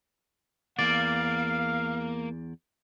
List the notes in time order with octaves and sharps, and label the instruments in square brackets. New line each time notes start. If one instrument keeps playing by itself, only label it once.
[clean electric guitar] E2 D5 [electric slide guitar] A#3 [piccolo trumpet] F5